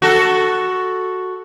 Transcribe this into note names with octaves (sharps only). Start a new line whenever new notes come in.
F#4 A4